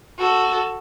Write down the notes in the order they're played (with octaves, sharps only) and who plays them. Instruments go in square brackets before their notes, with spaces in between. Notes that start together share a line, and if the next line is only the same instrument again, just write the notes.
[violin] F#4 A4